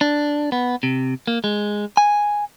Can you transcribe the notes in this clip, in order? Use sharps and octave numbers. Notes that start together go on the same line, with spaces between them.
D4
B3
C3
A#3
G#3
G#5